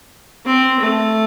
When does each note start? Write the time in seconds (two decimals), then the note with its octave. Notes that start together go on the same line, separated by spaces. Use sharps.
0.45 C4
0.79 A3